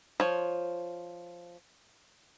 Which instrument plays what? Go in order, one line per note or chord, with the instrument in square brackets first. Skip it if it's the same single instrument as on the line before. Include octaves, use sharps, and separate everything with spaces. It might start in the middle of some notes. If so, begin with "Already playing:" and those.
[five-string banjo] F3 C#5